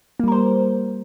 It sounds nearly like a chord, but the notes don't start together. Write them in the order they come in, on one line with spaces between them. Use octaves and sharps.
A#3 G3 A#4 C5